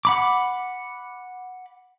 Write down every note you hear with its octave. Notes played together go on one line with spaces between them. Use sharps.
F#5 B5 D6